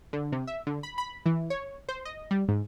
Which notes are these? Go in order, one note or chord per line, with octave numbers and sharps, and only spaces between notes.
D3
C3
E5
D3
B5
B5
E3
C#5
C5
D#5
G3
G#2